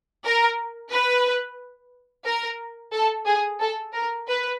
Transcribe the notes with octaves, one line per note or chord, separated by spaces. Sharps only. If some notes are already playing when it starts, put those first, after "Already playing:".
A#4
B4
A#4
A4
G#4
A4
A#4
B4